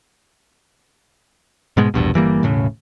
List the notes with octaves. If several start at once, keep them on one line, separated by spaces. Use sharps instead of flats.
G#2 B2 G#3
A#1 E2 G2 B2
G1 E3 G3 A#3
E1 A2 C#3